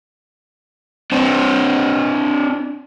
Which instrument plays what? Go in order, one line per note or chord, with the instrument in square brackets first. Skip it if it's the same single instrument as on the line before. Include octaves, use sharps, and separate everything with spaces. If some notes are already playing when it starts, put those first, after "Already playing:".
[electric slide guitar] C4 D4 C5